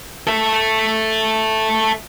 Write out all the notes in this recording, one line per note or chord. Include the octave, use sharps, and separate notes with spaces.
A4 E5